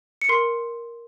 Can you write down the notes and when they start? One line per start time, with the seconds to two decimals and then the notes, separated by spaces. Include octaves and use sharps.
0.21 C#7
0.29 A#4 C6 C7